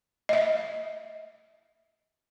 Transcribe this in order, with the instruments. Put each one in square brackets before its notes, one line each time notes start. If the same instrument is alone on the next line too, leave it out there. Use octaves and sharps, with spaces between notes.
[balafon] D#5 E5